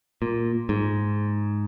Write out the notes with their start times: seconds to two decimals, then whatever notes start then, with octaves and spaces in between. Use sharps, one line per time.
0.22 A#2
0.69 G#2